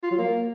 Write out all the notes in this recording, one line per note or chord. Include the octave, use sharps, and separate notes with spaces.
F4
F#3
A#3